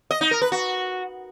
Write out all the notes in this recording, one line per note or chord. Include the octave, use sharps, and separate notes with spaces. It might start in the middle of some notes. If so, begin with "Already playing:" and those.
D#5
D#4
A#4
B4
F#4